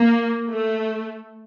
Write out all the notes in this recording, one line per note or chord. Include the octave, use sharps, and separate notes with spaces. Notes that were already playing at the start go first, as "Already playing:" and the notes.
Already playing: A#3
A3